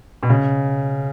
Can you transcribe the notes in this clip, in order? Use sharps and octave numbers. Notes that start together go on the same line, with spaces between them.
B2
C#3